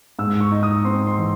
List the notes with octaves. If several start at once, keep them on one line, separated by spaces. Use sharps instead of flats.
G#2 E6
C#6
D#4
D#6
C4 C6
C6
E3